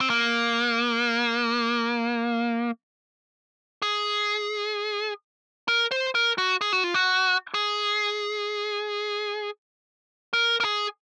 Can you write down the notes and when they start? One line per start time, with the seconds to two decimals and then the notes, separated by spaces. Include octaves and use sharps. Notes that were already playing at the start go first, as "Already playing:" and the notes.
0.01 C4
0.10 A#3
3.82 G#4
5.68 A#4
5.91 C5
6.15 A#4
6.38 F#4
6.61 G#4
6.73 F#4
6.84 F4
6.94 F#4
7.54 G#4
10.33 A#4
10.60 A#4
10.64 G#4